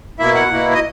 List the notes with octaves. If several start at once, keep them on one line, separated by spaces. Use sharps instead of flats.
B2 A#3 E4 E5
F#5
B2 A#3 E4
D#5